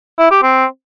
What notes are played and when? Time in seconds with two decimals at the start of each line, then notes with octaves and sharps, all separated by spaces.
0.19 E4
0.31 G4
0.43 C4